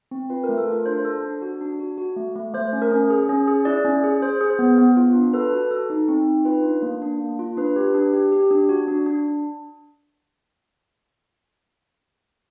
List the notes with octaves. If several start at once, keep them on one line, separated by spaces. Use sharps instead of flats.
C4
F4 B4
A#4
A3
A4
F4 A#4
D4 C5
A4
D4
F#4
D4
F#4
F#4
A3
A3
A3 C5
C#4
A#4
C#4
G#4
C#4
G#4
E4 D5
C#4
G#4
G#4 C5
G#4
C5
B3
B3
F4
D4
A4 B4
F#4
A4
D#4
C4
D#4
F4 B4
D4
A#3
D4
A#3
F4
D4 B4
G4
D4
G4
G4
D4
F#4
D4
D4